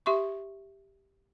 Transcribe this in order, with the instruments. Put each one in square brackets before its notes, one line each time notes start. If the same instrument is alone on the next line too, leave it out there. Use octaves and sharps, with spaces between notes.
[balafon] G4 E5 C6 C#6